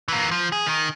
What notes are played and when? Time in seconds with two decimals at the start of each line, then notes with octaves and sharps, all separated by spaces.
0.08 E3 A#3
0.31 F3
0.52 G#4
0.66 D#3